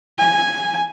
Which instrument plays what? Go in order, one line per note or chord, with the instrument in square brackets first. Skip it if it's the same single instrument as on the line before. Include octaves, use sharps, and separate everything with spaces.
[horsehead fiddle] G#5